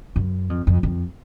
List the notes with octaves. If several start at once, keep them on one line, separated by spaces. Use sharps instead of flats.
F#2
F2
F2
F2